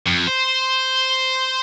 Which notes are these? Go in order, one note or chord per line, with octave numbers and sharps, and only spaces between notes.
F2
C5